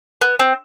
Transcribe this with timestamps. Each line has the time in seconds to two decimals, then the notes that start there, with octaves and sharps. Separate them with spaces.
0.21 B3
0.39 C4